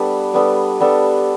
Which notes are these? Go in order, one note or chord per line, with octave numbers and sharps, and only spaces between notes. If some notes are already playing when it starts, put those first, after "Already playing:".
Already playing: G3 B3 D4 A4
G3 B3 D4 A4
G3 B3 D4 A4